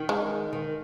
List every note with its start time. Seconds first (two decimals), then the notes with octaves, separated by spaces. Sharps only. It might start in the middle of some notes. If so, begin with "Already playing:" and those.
Already playing: D#3
0.09 G#3
0.53 D#3